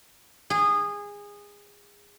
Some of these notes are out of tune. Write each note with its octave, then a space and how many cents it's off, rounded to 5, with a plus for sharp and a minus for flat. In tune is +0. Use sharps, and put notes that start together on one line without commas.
G#4 -20